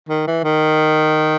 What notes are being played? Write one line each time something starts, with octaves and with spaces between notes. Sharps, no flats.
D#3
E3
D#3